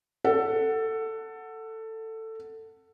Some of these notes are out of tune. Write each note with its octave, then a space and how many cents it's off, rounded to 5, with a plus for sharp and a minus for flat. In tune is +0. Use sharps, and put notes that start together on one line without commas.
A4 +15 F#5 +0